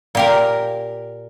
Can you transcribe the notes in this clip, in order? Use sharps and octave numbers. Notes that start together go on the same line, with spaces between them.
A#2 G4 A#4